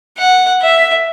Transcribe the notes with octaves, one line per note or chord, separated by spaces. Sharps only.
F#5
E5